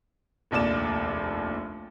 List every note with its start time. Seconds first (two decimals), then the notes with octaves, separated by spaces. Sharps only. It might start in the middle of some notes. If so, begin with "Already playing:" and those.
0.51 F1 A#1 D#2 D5 E7